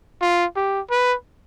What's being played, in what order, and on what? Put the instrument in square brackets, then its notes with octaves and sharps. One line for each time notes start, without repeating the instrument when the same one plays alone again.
[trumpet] F4
G4
B4